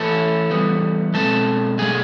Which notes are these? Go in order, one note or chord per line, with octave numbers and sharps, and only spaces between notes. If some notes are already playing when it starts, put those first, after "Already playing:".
Already playing: E3 A3 C#4 E4 A4 A5
E3 G3 B3
B2 G#3 C4 A4 A5
B2 F#3 A3 G#4 G#5